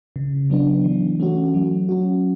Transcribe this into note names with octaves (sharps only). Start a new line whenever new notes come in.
C#3
F#3 B3 D4
E3
A3 C#4 F#4
F#3
C#4 F#4